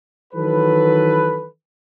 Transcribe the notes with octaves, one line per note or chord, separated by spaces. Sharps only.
D#3 E3 F#3 A4 B4